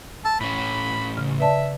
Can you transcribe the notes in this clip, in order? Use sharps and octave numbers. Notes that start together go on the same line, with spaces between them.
A5 E6
A2 C#4 B5
C#3 F6
B4 D5 E5 A5